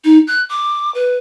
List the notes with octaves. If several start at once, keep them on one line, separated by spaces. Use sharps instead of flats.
D#4
F#6
D6
B4